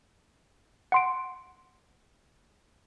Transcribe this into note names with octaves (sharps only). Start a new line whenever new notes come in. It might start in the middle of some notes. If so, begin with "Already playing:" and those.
F#5 C6 D7